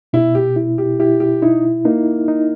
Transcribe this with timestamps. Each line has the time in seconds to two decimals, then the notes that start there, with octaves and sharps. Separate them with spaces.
0.13 B2 E4
0.35 G4
0.56 E4
0.78 G4
1.00 E4 G4
1.20 G4
1.42 D#4 E4
1.85 A#3 D#4
2.28 D#4